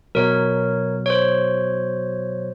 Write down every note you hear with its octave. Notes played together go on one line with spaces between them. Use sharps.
B2 F#3 A#4 C#5
C5 C#5